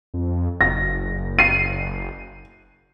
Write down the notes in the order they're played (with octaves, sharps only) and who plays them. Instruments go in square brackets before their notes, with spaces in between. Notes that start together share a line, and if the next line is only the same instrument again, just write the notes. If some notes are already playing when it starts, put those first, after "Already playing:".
[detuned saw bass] F2
[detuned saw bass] F#1 [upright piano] A#6
[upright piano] C7 D#7